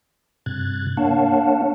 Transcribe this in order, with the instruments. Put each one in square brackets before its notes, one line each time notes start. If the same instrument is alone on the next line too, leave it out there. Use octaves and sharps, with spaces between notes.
[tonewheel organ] G2 C3 F#6 G#6 A6
A#3 D4 C#5 F5 F#5 A5